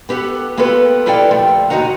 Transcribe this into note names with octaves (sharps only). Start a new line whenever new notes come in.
B3 G4 A4 F#5
A#3 B3 F4 G4 A4 B4
G3 E4 A4 D5 F5 G5
A#2 D3 F3 G3 A3
D#2 B2 D#4 F#4 F#5 A#5